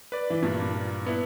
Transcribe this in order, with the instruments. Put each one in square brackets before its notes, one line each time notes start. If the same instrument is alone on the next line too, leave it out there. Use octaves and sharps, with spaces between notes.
[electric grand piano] B4 D5
[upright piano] E3
G2 A#2
[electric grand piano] B3 E4